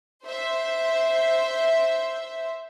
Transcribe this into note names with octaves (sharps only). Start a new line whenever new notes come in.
C5 E5